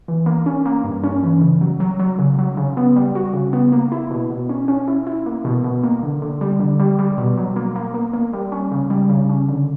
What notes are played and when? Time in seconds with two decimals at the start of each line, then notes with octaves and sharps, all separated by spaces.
0.08 E3
0.26 A#3
0.46 C#4
0.66 A#3
0.84 G2
1.04 C#4
1.23 E3
1.42 C#3
1.61 F#3
1.80 F#3
1.99 F#3
2.19 C#3
2.39 F#3
2.57 C#3
2.77 B3
2.96 G3
3.15 F#4
3.33 C#3
3.53 B3
3.72 A#3
3.92 E4
4.11 B2
4.30 B2
4.49 C#4
4.68 C#4
4.88 E4
5.07 E4
5.26 A#3
5.45 B2
5.64 B2
5.83 A#3
6.03 D3
6.22 D3
6.41 G3
6.60 D3
6.80 G3
6.99 G3
7.18 B2
7.38 F#3
7.56 A#3
7.76 A#3
7.94 A#3
8.13 A#3
8.33 G3
8.52 C#4
8.71 C#3
8.90 G3
9.10 C#3
9.29 C#4
9.49 D3